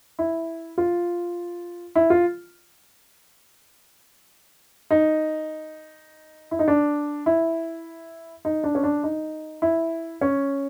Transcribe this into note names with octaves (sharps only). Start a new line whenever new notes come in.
E4
F4
E4
F4
D#4
E4
D#4
D4
E4
D#4
D4
C#4
D4
D#4
E4
C#4